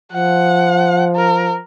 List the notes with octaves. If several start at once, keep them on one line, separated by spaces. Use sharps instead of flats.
F3 F#5
A#4